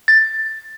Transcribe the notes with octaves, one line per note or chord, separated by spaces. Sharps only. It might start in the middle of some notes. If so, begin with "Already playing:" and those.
A6